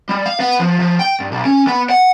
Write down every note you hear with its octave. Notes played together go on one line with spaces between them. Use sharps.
G3
F5
B3
F3
F3
G5
G2
B1
C#4
B3
F#5